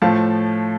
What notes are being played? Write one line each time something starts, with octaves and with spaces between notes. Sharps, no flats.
A2 F3 A3 F5 A5